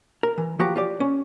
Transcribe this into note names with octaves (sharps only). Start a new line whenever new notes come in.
A#4
E3
F3 F#4 G4 A#5
F4 G4 D5
C#4